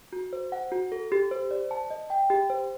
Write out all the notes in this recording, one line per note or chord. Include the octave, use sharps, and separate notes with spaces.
F#4
C5
F#5
F#4
A4
G4
C5
D5
A5
D#5
G5
G4
C5